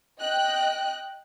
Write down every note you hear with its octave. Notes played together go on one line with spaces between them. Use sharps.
D#5 G5 F#6